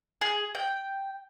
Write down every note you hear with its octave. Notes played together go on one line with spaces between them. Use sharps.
G#4
G5